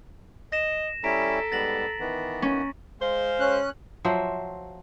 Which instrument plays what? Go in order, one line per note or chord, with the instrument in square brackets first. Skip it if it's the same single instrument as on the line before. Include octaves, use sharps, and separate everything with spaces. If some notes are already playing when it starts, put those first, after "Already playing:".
[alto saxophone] D#5 [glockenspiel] A#6 E7
[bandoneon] G3 C#4 E4 [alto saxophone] A4 [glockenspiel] A#5 B6 D7
[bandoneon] G#2 G3 B3 [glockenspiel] A6 A#6 F#7
[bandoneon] D#3 E3 B3
[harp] C#4
[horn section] G#3 C5 F5
[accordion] C#4 F#6
[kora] F3 F#3 C5 E5